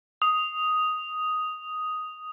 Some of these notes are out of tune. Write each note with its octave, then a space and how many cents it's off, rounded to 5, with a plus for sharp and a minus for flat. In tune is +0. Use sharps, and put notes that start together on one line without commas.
D#6 +5